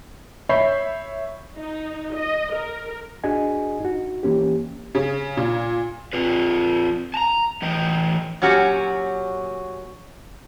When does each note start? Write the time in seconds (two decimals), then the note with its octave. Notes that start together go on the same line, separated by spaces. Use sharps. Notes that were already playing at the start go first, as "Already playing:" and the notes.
0.49 C#5 E5 B5 G6 C7
1.55 D#4
2.15 D#5
2.54 A#4
3.24 D4 F#4 G#4 D#5 G#5
3.80 D#4 F#4
4.23 E3 A#3 C#4 G4
4.95 C#3
5.37 A#2
6.13 C4 F4 B4
7.14 A5 A#5
7.62 A2 E3 D#5 G5
8.42 A#2 F#3 C#4 F#4 G4